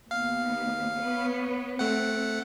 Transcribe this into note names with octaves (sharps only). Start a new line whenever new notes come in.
D#2 B3 F5
B3 B4 C#5
A3 C4 F#5